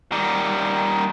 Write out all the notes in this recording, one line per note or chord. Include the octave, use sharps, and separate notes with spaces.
D#3 G3